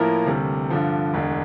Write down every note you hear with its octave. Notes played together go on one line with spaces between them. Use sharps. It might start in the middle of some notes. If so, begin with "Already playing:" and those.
Already playing: A2 F3 A#3 E4 A#4
D2 C3 G3
G2 D3 F3
E1 D2 D3